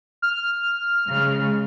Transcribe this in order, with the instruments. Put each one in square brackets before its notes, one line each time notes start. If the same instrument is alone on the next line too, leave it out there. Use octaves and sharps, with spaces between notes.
[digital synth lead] F6
[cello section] C#3 G#3